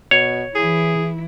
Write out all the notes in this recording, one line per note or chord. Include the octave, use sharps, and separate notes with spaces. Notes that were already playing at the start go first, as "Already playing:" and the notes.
B2 C#5
E3 E4 G#4